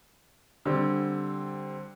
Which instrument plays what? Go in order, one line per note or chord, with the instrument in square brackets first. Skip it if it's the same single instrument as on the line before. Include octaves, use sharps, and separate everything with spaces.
[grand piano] D3 G3 C4